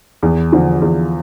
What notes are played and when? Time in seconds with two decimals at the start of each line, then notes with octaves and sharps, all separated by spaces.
0.23 E2
0.52 D3 F3
0.82 E2